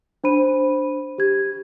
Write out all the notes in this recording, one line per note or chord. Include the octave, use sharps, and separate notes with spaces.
D4 C5 B5 D#7
G4 G#6